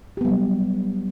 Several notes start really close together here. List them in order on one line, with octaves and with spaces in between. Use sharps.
G4 B3 G3 F#3